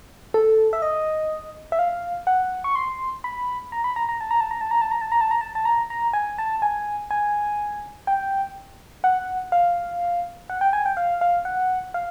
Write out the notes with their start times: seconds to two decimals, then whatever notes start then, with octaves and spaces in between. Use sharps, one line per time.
0.34 A4
0.73 E5
0.82 D#5
1.72 E5
1.79 F5
2.27 F#5
2.64 C#6
2.75 C6
3.24 B5
3.72 A#5
3.84 B5
3.96 A#5
4.09 A#5
4.21 A5
4.31 A#5
4.41 A5
4.51 A#5
4.61 A5
4.71 A#5
4.81 A5
4.91 A#5
5.01 A5
5.12 A#5
5.21 A5
5.31 A#5
5.41 A5
5.55 A5
5.65 A#5
5.90 A#5
6.13 G#5
6.38 A5
6.62 G#5
7.11 G#5
8.07 G5
9.04 F#5
9.52 F5
10.50 F#5
10.61 G5
10.73 G#5
10.86 G5
10.97 F5
11.21 F5
11.45 F#5
11.94 F5